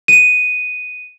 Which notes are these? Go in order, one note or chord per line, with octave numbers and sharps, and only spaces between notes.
D#7